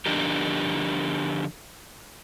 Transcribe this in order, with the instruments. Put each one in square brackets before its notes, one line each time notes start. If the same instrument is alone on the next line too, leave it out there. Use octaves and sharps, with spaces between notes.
[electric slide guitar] D3 F3 D4 D#4 G4 A#4